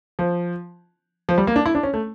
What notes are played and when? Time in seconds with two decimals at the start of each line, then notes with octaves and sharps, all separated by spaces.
0.19 F3
1.29 F3
1.38 G3
1.47 A#3
1.56 D4
1.66 E4
1.75 D4
1.83 C#4
1.94 A3